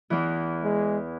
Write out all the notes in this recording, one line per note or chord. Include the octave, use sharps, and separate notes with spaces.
E2 E3
G#3